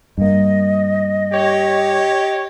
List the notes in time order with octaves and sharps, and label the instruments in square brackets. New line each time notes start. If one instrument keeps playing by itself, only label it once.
[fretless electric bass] G2 A#3 [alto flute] D#5
[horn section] G4 C#5